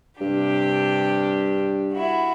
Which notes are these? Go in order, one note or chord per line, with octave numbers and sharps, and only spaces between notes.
G2 C3 D4 G4
E4 F#4